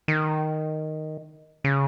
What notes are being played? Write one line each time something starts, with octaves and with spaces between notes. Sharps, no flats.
D#3
C#3